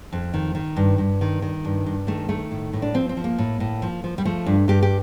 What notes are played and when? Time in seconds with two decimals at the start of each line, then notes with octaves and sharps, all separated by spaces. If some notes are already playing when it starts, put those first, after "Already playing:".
0.12 F2
0.34 D#3
0.55 D#3
0.76 G2
0.98 G2
1.21 D#3
1.42 D#3
1.65 G2
1.86 G2
2.07 D#3 A3
2.29 D#3 A3
2.51 A2
2.73 A2
2.82 D4
2.94 F3 C4
3.09 C4
3.17 F3
3.24 A#3
3.38 A2
3.60 A2
3.82 F3
4.04 F3
4.18 G3
4.25 F3 A3
4.46 G2
4.68 G2 G4
4.83 G4